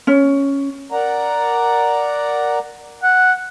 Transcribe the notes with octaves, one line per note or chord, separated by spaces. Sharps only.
C#4
A#4 D5 F#5 A#5
F#5